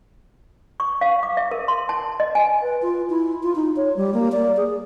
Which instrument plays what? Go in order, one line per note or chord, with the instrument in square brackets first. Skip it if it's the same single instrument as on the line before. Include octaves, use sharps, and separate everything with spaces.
[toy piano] C#6
F5
D6
E5
A#4
C6
A5
D#5
G#5
[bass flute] B4
F4
E4
F4
D#4
C#5
G3
A#3
D5
G#4